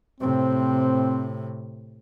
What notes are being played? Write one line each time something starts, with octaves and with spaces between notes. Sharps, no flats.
A2 C3 C4